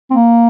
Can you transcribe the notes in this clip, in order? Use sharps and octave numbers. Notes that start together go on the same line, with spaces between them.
C4
A#3